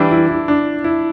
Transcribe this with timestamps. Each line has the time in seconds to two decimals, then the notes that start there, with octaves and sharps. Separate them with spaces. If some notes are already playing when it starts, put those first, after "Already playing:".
Already playing: E3 G3 D4 E4
0.11 E4
0.29 E4
0.48 D4
0.84 E4